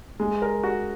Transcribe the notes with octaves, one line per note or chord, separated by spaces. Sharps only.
G#3
A#4
F#4